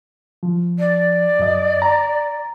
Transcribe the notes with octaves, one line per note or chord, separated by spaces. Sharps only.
F3
D5
F#2 D#5
A#5